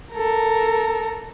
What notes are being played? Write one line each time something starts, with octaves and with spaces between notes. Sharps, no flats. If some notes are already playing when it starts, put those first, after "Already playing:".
A4 A#4